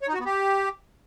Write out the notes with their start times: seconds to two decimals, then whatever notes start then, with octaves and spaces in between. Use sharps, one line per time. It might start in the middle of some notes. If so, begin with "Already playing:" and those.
0.02 C#5
0.08 D#4
0.14 F#4
0.20 B3
0.25 G4